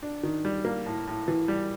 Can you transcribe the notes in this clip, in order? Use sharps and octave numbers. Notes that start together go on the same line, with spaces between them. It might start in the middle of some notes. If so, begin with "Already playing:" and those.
D4
D#3
G3
A#3
A2
A2
E3
G3